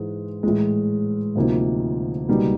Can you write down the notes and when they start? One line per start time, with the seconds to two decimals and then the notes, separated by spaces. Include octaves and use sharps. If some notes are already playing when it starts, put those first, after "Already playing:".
Already playing: G#2 E3 G#3
0.43 A2 E3 G#3
1.35 D2 C3 F3 A#3 D#4
2.28 C#2 B2 G3 A#3 D#4